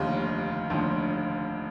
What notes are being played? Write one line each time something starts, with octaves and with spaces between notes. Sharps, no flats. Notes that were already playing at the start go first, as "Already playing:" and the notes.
Already playing: F1 D#2 D3 F3 F4 G4
F1 D#2 D3 F3